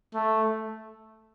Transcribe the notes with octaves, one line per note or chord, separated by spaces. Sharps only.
A3